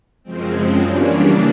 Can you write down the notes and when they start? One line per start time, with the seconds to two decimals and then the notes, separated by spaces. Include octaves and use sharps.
0.23 F#2 C#3 F3 G#3 C4
0.83 C#3 E3 G3 A#3 D4